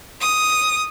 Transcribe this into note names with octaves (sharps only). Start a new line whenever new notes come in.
D#6